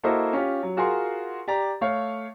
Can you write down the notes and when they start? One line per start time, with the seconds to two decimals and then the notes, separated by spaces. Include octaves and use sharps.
0.03 A#3 E4 F#4 A4 C5 D#5
0.33 C#4 F4 G4
0.63 F#3
0.76 F4 F#4 G#4 A#4 C6
1.48 G4 D5 A#5
1.81 A3 C#5 F5